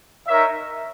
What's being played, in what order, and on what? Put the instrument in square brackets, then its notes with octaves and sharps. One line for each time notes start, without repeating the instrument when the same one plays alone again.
[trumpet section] D#4 A#4 C#5 E5